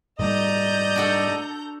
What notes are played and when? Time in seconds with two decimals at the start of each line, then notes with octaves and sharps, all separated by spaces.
0.19 G#2 G3 A3 D5 D#5 A#5 G6
0.96 D4 F#4 A4